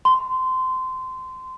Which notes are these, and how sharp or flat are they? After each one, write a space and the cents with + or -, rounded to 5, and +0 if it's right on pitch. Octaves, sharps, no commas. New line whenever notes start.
C6 -20